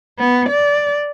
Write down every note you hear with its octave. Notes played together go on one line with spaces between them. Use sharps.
B3
D5